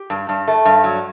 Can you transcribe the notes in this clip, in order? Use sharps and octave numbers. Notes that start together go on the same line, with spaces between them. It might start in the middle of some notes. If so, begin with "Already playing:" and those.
Already playing: G4
G2
G2
A3
G2
F#3